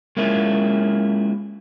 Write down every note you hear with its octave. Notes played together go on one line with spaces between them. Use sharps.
G#3 A#3 C#4 E4 F4